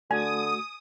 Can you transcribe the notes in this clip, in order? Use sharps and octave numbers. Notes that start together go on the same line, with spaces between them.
D3 A3 F#4 G#5 D#6